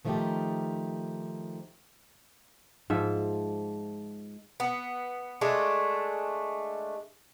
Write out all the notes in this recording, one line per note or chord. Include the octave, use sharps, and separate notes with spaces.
D#3 F3 A3 C#4 D#4 G4
G#2 F3 E5
B3
G#3 A3 D4